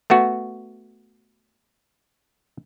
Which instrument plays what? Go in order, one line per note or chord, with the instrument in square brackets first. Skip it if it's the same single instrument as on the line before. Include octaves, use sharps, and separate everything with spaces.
[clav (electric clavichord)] A3 B3 F#4